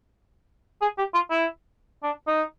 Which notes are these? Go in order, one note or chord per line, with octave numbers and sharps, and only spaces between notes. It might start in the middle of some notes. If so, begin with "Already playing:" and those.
G#4
G4
F4
E4
D4
D#4